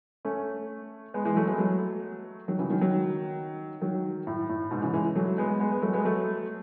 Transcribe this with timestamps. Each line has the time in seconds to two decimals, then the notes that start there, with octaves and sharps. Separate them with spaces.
0.25 A3 C#4
1.14 G#3 B3
1.25 E3 G#3
1.36 F#3 A3
1.47 G#3 B3
1.58 F#3 A3
2.48 D#3 F#3
2.59 C#3 E3
2.70 D#3 F#3
2.81 D#3 F#3
3.81 D#3 F#3
4.27 A2
4.49 A2
4.71 G#2 B2
4.82 C#3 E3
4.94 E3 G#3
5.16 F#3 A3
5.38 G#3 B3
5.60 G#3 B3
5.71 G#3 B3
5.82 F#3 A3
5.93 G#3 B3
6.05 F#3 A3